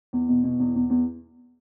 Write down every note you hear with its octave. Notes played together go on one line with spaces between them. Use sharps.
E2
B2
B2
E2
E2
E2